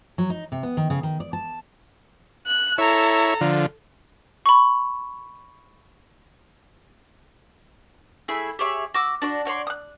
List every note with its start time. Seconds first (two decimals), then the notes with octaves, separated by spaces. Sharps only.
0.18 F#3
0.30 D#4
0.52 C3
0.63 B3
0.77 D#3
0.90 C#3
1.03 D#3
1.20 D5
1.33 A5
2.47 F#6
2.78 E4 A4 C#5 A#5
3.41 D3 F3
4.46 B5 C#6
8.28 A3 E4 G#4 B5
8.59 G4 G#4 C#5 E5
8.94 F#4 D6 E6
9.22 D4 F#4 D5
9.45 F#4 C#5 D5 C6
9.67 D#6 F#6